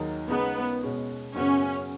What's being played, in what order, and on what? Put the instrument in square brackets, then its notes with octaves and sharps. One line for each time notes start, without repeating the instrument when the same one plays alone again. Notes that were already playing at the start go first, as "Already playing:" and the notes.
Already playing: [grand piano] D#2 D#3 F#3 D#4 G#4
[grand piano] C#3 G#3 D#4 [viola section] B3
[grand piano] B2 G#3 C#4
[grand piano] F#2 C#3 B3 F#4 [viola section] C#4